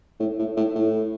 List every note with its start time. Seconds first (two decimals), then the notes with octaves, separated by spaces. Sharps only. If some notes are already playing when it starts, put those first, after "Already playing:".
0.20 A2
0.39 A2
0.57 A2
0.75 A2